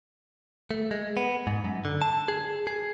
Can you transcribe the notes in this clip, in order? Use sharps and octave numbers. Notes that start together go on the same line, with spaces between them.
A3
G#3
B3
G#2
F#2
D3
A5
G#4
G#4